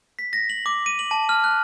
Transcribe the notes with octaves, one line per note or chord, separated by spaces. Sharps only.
B6
A#6
F#7
D6
D#7
F#7
A5
F6
F#6